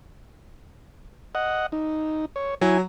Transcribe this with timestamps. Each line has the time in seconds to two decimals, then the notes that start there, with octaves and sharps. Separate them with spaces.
1.35 D#5 F#5
1.72 D#4
2.36 C#5
2.61 F#3 E4 G#5